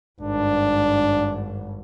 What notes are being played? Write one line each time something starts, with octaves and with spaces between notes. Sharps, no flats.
G#1 G2 D4